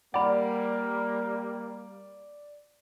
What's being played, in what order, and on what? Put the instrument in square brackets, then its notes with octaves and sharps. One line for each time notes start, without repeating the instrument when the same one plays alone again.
[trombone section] G3 A#3 [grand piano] D5 [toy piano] F#5 B5